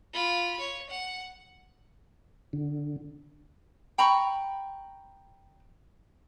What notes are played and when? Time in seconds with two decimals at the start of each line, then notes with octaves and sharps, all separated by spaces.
0.14 F4 B5
0.60 C#5
0.90 F#5
2.53 D3
3.98 G5 A#5 B5 C#6